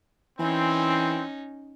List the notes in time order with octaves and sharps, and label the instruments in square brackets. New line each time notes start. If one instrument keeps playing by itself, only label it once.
[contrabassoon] E3 [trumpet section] C4 [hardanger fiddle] C#4 D#4